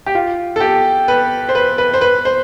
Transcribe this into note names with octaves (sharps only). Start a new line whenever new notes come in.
G4
F4
A4
G4
B4
C5
B4
B4
C5
B4
C5